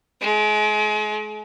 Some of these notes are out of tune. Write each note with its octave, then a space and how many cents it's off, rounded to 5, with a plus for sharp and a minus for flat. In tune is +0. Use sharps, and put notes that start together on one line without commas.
G#3 +35